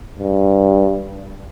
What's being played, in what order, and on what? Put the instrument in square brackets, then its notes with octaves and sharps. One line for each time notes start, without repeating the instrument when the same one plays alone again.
[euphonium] G2